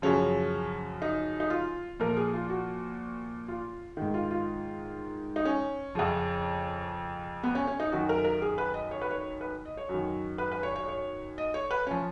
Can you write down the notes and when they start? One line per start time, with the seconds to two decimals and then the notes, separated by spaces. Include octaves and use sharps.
0.02 F#2 C#3 F3 C#4
1.02 D#4
1.40 D#4
1.50 F4
1.99 A#2 F3 A#4
2.17 G#4
2.33 F4
2.49 F#4
3.48 F4
3.97 G#2 D#3
4.14 F4
4.31 F4
5.36 D#4
5.45 C#4
5.95 F2 C#3 F3
7.43 B3
7.55 C#4
7.67 C#4
7.80 D#4
7.92 F#2 D#3 F#4
8.09 A#4
8.24 A#4
8.42 G#4
8.58 B4
8.74 D#5
8.91 C#5
9.02 B4
9.11 C#5
9.41 B4
9.65 D#5
9.77 C#5
9.89 F#2 D#3
10.38 B4
10.52 B4
10.63 C#5
10.76 C#5
10.88 C#5
11.38 D#5
11.54 C#5
11.71 B4
11.87 F3 C#4